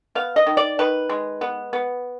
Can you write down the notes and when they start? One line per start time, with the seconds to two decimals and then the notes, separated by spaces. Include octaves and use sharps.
0.15 B3 F5
0.36 D#5
0.46 D#3
0.57 D5
0.79 D#3 B4
1.09 G#3
1.41 B3
1.73 B3